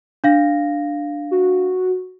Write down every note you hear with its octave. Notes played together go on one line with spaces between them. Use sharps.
D4 F5 A#6
F#4